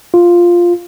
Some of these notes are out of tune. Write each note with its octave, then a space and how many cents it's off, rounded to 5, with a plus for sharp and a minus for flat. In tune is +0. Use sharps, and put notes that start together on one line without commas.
F4 +0